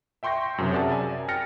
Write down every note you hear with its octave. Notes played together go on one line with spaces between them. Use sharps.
E5 G5 C6 C#6 G6 A#6
F#2 C3 F#3
G#4 A#4 D5 E5 F#5 A5
G#5
G5 F6 A6 A#6 C#7